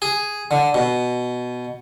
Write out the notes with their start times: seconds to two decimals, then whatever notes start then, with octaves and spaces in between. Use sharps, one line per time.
0.02 G#4
0.51 D3
0.74 B2